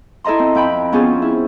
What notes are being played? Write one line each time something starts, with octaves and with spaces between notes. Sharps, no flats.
E4 A4 D#5 A#5 C6
C4
F2 G5 B5
B3 C#4 F4 G#4 C5
E4